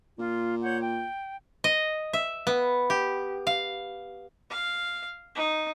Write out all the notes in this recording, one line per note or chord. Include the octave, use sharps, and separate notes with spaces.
A#2 F4
C#5 F#5 G6
G5
D#5
E5
B3
G4
F5
F5
D#4